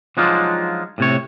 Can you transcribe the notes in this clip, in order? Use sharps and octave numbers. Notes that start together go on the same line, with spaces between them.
F3 F#3 G#3 D4 D#4 F4
A2 C3 C#5